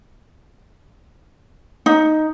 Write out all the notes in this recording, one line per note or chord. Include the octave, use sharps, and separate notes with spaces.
D#4